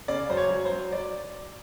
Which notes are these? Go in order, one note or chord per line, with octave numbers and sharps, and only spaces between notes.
C#3 D5
F#3 C5
C#5
F#3
C5
F#3
F#3 D5